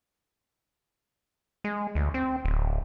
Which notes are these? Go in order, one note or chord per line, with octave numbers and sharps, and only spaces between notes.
G#3
D2
C4
D1